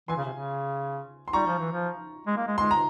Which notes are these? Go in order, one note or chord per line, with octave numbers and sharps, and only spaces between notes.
E3 G#5 C6
C#3
C3
C#3
C6
G3 A#5 C#6
F3
E3
F3
G#3
A#3
G#3
G#3 C6
A#5